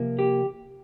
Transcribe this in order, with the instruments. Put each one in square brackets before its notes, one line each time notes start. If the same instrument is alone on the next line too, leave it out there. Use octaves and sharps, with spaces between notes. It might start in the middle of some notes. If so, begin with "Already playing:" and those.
Already playing: [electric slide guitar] C3 F3 A#3
G4